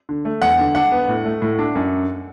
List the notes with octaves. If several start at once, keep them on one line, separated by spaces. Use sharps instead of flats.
D3
A3
E2 F#5
D3
D4 F#5
B3
A2
A3
A2
D4
F#2